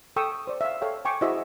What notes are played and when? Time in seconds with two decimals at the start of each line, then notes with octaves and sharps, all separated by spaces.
0.16 A4 G5 C#6 D#6 E6
0.47 C5 D5
0.61 E5 F5
0.81 A4 C#5 F5 G5
1.05 G5 G#5 C#6 D6
1.21 E4 F#4 G#4 C5 D#5 E5